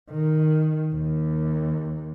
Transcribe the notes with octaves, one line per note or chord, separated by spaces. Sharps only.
D#3
D#2